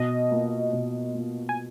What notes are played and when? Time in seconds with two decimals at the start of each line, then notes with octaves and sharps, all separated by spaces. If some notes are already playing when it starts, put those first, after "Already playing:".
Already playing: B2 D#5
0.31 A#3 F4
0.73 B2
1.14 A#3 F4
1.49 G#5